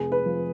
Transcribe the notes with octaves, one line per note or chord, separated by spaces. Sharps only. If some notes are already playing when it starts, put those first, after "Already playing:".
Already playing: F1 G#4
B4
F3